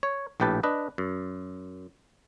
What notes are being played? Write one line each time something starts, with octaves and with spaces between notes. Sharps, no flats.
C#5
A#1 A2 G4 B4 A5
D4 B4 D#5
F#2